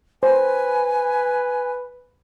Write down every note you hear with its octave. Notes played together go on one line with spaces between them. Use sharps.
B4 C5 G#5